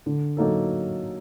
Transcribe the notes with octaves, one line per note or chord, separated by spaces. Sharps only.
D3
F#3 A#3 D#4 A4